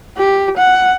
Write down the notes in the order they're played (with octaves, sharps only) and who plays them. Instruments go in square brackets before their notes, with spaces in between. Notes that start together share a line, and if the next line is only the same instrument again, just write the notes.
[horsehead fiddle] G4
F#5